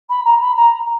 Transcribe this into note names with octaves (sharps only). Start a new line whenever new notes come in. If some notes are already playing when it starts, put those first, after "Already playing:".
B5
A#5
B5
A#5